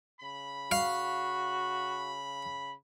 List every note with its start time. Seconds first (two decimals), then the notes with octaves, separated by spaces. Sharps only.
0.20 C#3 B5
0.71 F#4 F5